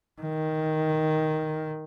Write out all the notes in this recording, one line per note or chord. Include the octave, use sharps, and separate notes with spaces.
D#3